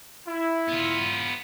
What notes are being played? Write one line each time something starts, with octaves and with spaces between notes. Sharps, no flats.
E4
B3 F4